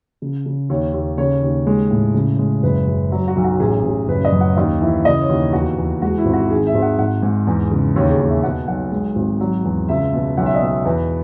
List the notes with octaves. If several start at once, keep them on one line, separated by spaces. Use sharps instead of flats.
C#3
C#3
D#2 C#5
D#2
C#3 C#5
D#2
G#3
A2
C#3
G#3
F#1 B4
F#1
F#3
F#4
B1
F#4
A1 G#4
A1
F#1 B4
D#5
F#2
F#5
D#2 D#5
E3 E5
C#3 D#5
C#5
D#2
E2 F#4
E2
G#3 F#4
E4
G#1
F#4
D#3 G#4
E5
G#1
F#5
G#2 F#5
G#2
E2
C#3
D#2 C#5
G#4
D#2
E5
B2 F#5
B1 F#5
G#3
G#1
F#3
E2
C#2 E5
B2
B1 F#5
E5
D#5
B2 E5
E2 B4